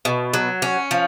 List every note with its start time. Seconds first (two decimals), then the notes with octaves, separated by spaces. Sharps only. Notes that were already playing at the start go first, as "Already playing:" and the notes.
0.05 B2
0.34 F#3
0.62 C#4
0.91 F3